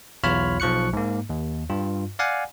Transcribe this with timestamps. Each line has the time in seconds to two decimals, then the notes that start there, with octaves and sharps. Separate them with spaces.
0.24 B1 E2 F4 C#5 B5 F6
0.60 B1 F3 C#6 F#6 C#7
0.93 G#2 A#3
1.29 D#2
1.70 G2 F4
2.19 D5 F5 F#5 G#5